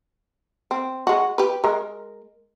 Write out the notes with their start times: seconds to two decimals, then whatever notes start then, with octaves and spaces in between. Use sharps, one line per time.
0.71 C4
1.07 G#3 F#4
1.38 G4 B4
1.64 G#3 A#4